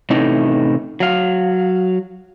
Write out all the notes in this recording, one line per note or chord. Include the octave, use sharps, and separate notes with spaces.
A2 C3 E3 A3 C#4 D#4
F#3 F5